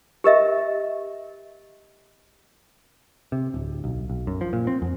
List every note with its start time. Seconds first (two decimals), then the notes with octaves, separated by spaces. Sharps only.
0.24 G4 A#4 D#5 E5
3.32 C3
3.54 D1
3.84 B1
4.10 B1
4.27 F#2
4.41 F3
4.53 A#2
4.67 C4
4.82 F2